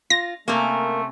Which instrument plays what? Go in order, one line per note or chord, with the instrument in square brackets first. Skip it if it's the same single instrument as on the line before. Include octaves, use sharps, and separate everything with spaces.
[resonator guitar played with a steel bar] F4 [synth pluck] A#6
[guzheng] C3 C4 C#4 [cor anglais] A3 [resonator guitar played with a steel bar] A#3 A#4